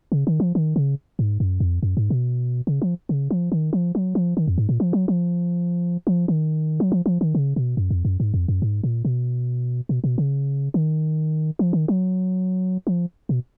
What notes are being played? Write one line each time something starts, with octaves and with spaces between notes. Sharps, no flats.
C#3
D#3
F3
D#3
C#3
G#2
F#2
F2
F#2
G#2
B2
C#3
F3
C#3
F3
D#3
F3
F#3
F3
D#3
F2
G#2
A#2
F3
F#3
F3
F3
D#3
F#3
F3
F3
D#3
C#3
B2
F#2
F2
F#2
G#2
F2
F#2
G#2
A#2
B2
B2
B2
C#3
D#3
F3
D#3
F#3
F3
B2